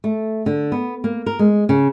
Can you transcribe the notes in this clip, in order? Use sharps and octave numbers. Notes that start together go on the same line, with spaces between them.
A3
D3
B3
A#3
A#4
G#3
C#3